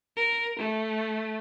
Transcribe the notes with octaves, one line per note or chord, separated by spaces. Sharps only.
A#4
A3